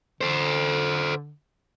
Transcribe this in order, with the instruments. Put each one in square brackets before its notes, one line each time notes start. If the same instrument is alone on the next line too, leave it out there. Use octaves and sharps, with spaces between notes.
[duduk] D3 [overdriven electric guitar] A4 C5